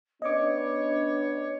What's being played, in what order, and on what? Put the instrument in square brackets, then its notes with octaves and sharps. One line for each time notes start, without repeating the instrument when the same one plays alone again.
[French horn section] B3 C#4 D4 [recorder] C#5 [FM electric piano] D#5 D6